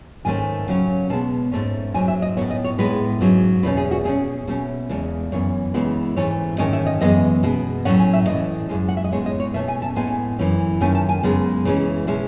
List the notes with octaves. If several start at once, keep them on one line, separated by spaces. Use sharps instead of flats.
G#2 D#3 A3 C#4 G#5
C#3 F#3 C#4
B2 G#3 B3 A5
G#2 F#3 A3 C#4
G#2 F#3 C#4 G#5
E5
D#5
A2 F#3 B3 C#5
D#5
C#5
A2 G#3 B3 B4
G#2 F#3 C#4
E2 B2 A3 C#4 B4
G#4
F#4
B2 A3 C#4 G#4
B2 A3 C#4
E2 C#3 G#3 A4
F#2 E3 B3 C#5
C#3 E3 G#3 B3
G#2 E3 A3 C#4 C#5
G#2 D#3 A3 C#4 D#5
E5
D#5
F#2 E3 G#3 B3 D#5
B2 G#3 B3
A2 F#3 A3 C#4 F#5
G#5
E5
A2 E3 G#3 D#5
F#2 E3 G#3
F#5
E5
D#5
A2 G#3 B3 C#5
D#5
C#5
B2 A3 C#4 E5
G#5
A5
A2 G#3 B3 G#5
F#2 E3 A3 C#4
F#2 D#3 A3 C#4 G#5
A5
G#5
F#2 C#3 G#3 B3
C#3 E3 G#3 C#4
B2 G#3 C#4 E5